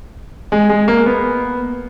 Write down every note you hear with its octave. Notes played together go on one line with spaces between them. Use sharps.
G#3
G#3
A#3
B3